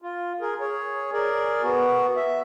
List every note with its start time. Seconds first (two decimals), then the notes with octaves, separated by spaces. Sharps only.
0.02 F4
0.41 G#4 A#4
0.61 G#4 C#5
1.13 G#4 A#4 D5
1.62 B3 F#4
2.16 E5